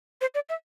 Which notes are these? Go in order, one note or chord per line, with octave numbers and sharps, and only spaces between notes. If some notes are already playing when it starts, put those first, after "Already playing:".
C5
D5
E5